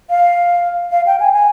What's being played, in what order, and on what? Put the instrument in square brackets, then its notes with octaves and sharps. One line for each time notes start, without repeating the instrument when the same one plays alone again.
[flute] F5
F5
G5
G#5
G#5